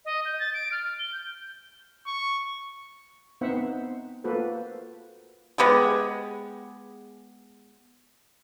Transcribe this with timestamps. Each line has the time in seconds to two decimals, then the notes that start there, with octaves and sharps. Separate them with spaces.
0.05 D#5
0.25 G6
0.39 A6
0.54 D7
0.72 F6
0.99 G7
1.13 G6
2.07 C#6
3.41 B3 C4 D#4 C5 E5 F#5
4.24 A#3 F4 F#4 A4 B4 C5
5.58 G#3 B3 G4 G#4